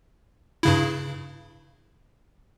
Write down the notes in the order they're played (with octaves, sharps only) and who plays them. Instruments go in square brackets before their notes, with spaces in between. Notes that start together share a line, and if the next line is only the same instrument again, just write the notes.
[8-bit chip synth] G2 C#3 E4